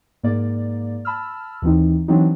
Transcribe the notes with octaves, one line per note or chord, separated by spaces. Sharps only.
G#2 A#3 D5
A5 B5 E6 F6
D#2 E3 C4 D#4
E3 F#3 C4 D4 D#4